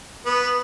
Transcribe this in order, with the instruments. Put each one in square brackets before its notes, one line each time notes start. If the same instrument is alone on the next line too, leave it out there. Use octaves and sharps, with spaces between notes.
[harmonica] B3